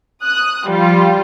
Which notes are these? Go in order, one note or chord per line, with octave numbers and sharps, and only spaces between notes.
D#6 F#6
F3 G3 F4